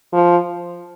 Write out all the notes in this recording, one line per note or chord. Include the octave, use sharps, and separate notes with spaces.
F3